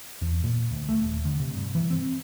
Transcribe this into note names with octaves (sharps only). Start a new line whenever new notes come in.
E2
A#2
D2
A3
D#1
D3
C3
G2
E3
C4